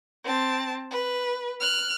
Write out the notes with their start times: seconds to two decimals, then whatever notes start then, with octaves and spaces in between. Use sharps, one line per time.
0.24 C4 A5
0.91 B4
1.60 F6 F#6